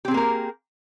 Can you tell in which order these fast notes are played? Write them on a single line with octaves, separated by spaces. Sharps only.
G4 C4 G#4 A#3 A#4